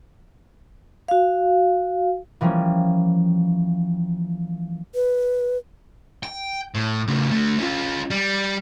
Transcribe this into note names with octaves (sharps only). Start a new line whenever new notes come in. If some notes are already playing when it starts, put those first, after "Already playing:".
F#4 F5
E3 F3 G3 A#3 C#4
B4
G5
A2
C#3 A3
D3 A3
C#4 F4
G3